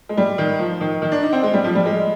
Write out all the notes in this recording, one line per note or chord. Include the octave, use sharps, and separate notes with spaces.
G#3
G3
D#3
F3
D#3
D#3
D4
D#4
C4
G#3
G3
F3
G3
G#3